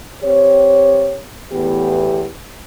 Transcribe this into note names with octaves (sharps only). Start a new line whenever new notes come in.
C4 G4 C#5
E2 A2 E3 B3 G4